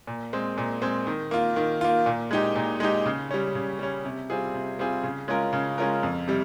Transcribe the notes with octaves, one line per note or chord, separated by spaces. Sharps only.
A#2
G#3 C4
A#2
G#3 C4
D#3
A#3 F4
D#3
A#3 F4
A#2
G#3 D#4 G4
A#2
G#3 D#4 G4
C#3
G3 C#4
C#3
G3 C#4
C3
G3 C4 F4 G#4
C3
G3 C4 F4 G#4
C#3
G#3 C#4 F4 A#4
C#3
G#3 C#4 F4 A#4
F2
C3 G3